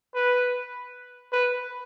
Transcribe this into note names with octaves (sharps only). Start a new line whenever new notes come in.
B4
B4